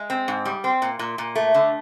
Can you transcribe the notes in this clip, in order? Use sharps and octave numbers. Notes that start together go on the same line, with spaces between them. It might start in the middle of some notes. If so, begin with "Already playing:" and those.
Already playing: G#3
C4
G#2
G3
C4
A#2
A#2
A#2
A3
D3